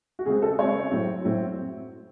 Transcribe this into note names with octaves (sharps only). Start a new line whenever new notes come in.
F#4
C#3 G#3 C4 G#4
A4
C#3 G#3 C4 C#5
A2 F#3 C4
A2 F#3 C4